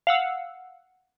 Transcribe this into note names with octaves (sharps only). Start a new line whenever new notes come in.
F5 F#5 E6